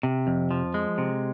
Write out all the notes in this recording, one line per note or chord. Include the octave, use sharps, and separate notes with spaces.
C3
F2
F3
G#3
C3